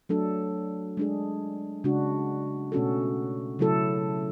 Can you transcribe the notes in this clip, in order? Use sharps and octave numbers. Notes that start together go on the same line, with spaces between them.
F#3 A3 D4 A4
G#3 D4 G#4
C#3 G#3 D4 F#4
B2 A3 C#4 F#4 A4
C#3 F#3 A3 E4 A4